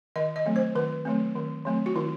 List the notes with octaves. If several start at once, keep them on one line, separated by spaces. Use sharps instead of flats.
D#3 D#5
D#5
F#3 A3 C4
C5
D#3 B4
F#3 A3 C4
D#3
F#3 A3 C4
F#4
D#3 E4